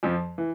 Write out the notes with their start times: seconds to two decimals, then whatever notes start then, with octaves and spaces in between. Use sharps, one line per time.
0.03 F2 F3
0.38 E3